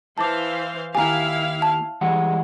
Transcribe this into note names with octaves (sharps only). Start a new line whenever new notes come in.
E3 C5 F5 A5 D6
D#2 E4 G4 F5 G#5 A#5
A5
E3 G3 G#3 F#5